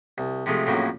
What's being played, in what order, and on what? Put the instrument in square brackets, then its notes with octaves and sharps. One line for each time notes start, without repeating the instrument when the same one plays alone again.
[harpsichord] C2
C3 F3 G#3 A3
F2 A2 C#3 F3 F#3 A#3